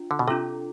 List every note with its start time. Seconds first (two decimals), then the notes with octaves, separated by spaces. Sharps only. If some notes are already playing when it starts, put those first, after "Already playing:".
Already playing: D4 F4
0.11 D3
0.19 B2
0.28 C3 D4 F4 A4